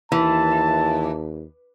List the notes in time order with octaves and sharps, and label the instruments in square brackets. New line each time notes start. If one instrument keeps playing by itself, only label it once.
[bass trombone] D#2 [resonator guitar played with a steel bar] E3 [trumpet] A5